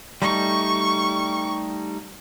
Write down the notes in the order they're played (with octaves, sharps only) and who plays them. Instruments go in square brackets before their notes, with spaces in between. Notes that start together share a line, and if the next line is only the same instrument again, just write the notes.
[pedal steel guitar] G3 A3 D#4 [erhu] C#6